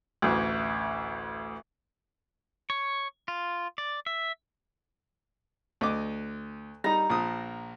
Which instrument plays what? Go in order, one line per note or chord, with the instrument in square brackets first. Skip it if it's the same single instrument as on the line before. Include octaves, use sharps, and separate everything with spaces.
[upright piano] A1 D2
[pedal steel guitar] C#5
F4
D5
E5
[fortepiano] D2 D#5 D6
[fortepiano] G3 D#4 [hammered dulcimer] A#5
[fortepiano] A#1 F3 D#6